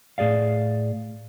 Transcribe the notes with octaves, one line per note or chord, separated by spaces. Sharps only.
A2 G#4 D5 F5